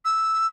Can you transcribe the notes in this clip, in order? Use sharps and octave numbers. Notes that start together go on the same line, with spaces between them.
E6